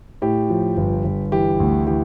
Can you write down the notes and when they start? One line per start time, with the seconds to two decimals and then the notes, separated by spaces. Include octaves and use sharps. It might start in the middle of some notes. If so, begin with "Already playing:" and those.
0.22 A2 G4
0.50 F3
0.77 G1
1.04 G1
1.32 E3 G4
1.60 D2
1.87 E3 G4